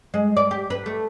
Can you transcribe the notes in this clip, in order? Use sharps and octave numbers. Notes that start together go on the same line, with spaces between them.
G#3
D5
G4
B4
A3